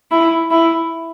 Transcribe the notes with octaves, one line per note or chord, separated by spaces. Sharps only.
E4
E4